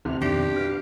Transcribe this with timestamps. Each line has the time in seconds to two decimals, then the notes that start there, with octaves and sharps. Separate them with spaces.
0.05 A1 D2 C3 F#5 F6
0.21 F2 B2 D#3 D4 G4
0.56 F#4 B4 F5